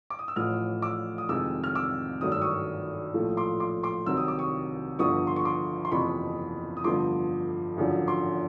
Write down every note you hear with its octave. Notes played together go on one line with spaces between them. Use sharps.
D6
D#6
E6
A1 A2 F3 D#6 F6
D6 E6
D#6
F2 C3 D#3 G#3 D6 E6
F6
D6 E6
G#1 G2 D#3 F#3 A3 D#6
E6
C#6 D#6
A#1 A2 F3 A3
C6 D6
C6 D6
C6 D6
C2 C3 D#3 F#3 E6
D#6
D6
C#6 D#6
G1 G2 D3 F3 C#6 D#6
C6
C#6
C6 D6
C6
F#1 F2 C3 E3 B5 C#6
D#6
G1 G2 D3 F3 A3 C6 D6
G#1 F#2 D3 F3
C6 D6